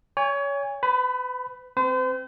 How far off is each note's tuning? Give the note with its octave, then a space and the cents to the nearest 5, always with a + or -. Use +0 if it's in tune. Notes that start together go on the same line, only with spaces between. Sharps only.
C#5 +25 G#5 -30
B4 +35 B5 +0
C4 +0 C5 -40